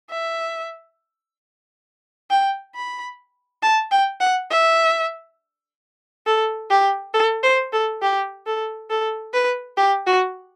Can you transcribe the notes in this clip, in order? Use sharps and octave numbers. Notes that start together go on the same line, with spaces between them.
E5
G5
B5
A5
G5
F#5
E5
A4
G4
A4
C5
A4
G4
A4
A4
B4
G4
F#4